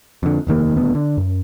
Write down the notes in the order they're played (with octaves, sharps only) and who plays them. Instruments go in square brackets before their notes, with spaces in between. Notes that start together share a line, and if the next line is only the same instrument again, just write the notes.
[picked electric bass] F2 D3
F1 D#2 D#3 A#3
D#1 D2 B3
D3
F#2